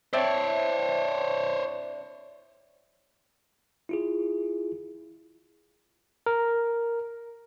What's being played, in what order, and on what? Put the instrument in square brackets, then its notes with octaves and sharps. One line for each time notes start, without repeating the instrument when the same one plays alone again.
[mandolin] C4 D4 E4 [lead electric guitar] C5 C#5
[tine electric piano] E4 F4 G#4
A#4